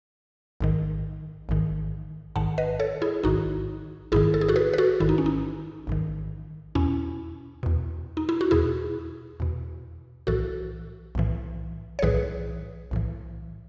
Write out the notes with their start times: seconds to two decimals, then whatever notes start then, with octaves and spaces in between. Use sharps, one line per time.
0.61 A1 G#2 D#3
1.49 A1 G#2 D#3
2.36 A1 G#2 D#3 F#5 A5
2.58 B4 D#5
2.80 A4 C#5
3.02 E4 G#4
3.23 A1 G#2 D#3 D#4 F#4
4.12 A1 G#2 D#3 E4 G#4
4.34 A4
4.41 G#4
4.48 F#4 A4
4.56 G#4 B4
4.73 B4
4.78 F#4 A4
5.00 A1 G#2 D#3 E4
5.09 D#4
5.18 C#4
5.26 D#4
5.87 A1 G#2 D#3
6.75 E2 B2 C#4 E4
7.63 E2 B2
8.17 D#4
8.29 E4
8.41 F#4
8.51 E2 B2 E4 G#4
9.40 E2 B2
10.27 B1 A2 E3 F#4 A4
11.15 B1 A2 E3
11.99 C#5
12.02 B1 A2 E3 G#4 B4
12.91 B1 A2 E3